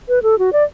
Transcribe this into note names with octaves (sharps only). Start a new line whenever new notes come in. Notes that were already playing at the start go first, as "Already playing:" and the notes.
B4
A4
F#4
D5